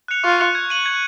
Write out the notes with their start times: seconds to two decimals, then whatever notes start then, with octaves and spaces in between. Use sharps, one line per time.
0.08 F#6 C#7 F7
0.24 F4 C#6
0.40 F#6 C#7 F7
0.55 G#6
0.70 D#7 F#7
0.86 G#6